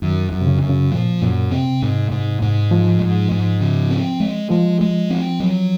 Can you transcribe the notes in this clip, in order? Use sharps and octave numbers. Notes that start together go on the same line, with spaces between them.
F#2 D#3
F#2
C3
C#3
F#2
C#3
A#2 F3
F#2 A#2
C3 C4
G#2
G#2
G#2
F3 G#3
G#2
G#2
C#3
C4
G#3
F3 G#3
G#3
C4
F#3